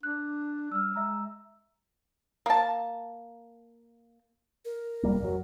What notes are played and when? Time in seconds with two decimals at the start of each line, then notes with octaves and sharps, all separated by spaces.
0.03 D4 F#6
0.72 G3 E6 F6
0.94 G#3 E5 A#5 E6
2.46 A#3 A5
4.65 A#4
5.03 F1 G3 A#3
5.22 F#2 F#3